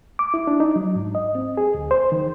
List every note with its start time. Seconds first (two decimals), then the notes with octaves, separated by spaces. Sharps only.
0.19 D6
0.34 E4
0.47 D4
0.60 D#4
0.76 F#3
0.96 G#2
1.15 D#5
1.35 C4
1.57 G#4
1.75 D2
1.91 C5
2.12 D#3